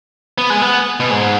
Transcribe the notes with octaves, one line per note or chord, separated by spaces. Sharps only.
B3
G#3
B3
B2
G#2